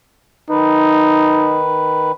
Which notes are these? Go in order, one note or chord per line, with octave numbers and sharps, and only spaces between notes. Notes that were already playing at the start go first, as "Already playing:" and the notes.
D#3 D#4 B4